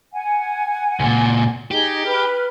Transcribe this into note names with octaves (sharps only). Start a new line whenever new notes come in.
F#5 G#5
C#2 A#2
D#4 G4 G#4
B4 B5 F6